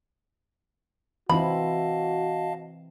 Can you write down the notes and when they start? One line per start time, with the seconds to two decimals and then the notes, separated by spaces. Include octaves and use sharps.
1.30 E3 C4 E4 F#4 D#5 F5 A5 B5